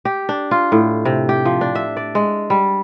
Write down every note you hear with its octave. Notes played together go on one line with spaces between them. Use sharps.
G4
D4
F4
A2
C3
G4
F3
D4
E5
D5
G#3
G3